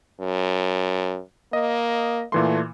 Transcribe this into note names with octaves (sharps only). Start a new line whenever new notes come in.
F#2
A#3 D#5
A#2 E3 A3 C6